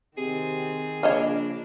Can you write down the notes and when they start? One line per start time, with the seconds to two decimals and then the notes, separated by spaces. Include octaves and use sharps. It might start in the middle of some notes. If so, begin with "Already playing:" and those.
0.17 C3 D#3 C4 G#4
1.03 A#1 C#3 A#3 D4 C#5 D#5 F5